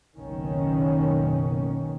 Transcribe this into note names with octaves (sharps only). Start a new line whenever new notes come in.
F#1 B1 B2 D#3 C#4